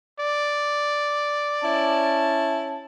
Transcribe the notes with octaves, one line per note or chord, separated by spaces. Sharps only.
D5
C#4 E4 A5